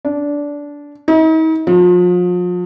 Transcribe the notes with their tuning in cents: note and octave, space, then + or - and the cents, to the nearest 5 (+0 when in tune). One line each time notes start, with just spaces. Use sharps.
D4 -15
D#4 +45
F3 +40